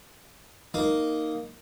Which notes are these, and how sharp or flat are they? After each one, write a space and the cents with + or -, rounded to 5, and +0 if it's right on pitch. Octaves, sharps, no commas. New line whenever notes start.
A#3 +0 D#4 +0